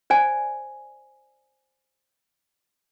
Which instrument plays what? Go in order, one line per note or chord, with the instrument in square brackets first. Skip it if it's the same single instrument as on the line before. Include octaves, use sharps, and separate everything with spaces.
[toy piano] C5 D5 G#5